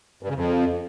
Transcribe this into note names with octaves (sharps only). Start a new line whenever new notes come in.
G2
C#3
F2